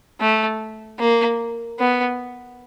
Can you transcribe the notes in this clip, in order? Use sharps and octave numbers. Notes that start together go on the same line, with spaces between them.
A3
A#3
B3